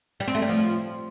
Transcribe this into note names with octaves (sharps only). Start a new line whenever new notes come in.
G3
C4
A3
G3
F3